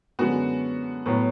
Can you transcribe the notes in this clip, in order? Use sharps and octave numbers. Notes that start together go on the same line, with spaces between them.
F#2 D3 G#3 B3 F#4
A2 F#3 B3